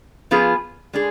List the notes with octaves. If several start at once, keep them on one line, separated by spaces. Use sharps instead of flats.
F3 B3 F4 G#4
G#3 D4 G#4